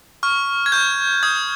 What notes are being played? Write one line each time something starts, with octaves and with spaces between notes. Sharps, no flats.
C#6 F6
G#6
C#6 F6 G6
D#6 G6 G#6